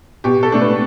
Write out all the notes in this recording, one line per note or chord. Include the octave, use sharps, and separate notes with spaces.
B2 G4
A4
A3 D4
B4